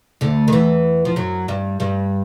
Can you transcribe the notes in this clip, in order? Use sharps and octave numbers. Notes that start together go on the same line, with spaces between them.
D2 D3
D#3
E2 E3
F3
F#2 F#3
G2 G3
G2 G3